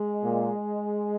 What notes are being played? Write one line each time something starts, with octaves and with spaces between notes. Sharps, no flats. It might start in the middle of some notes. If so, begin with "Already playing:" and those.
Already playing: G#3
A#2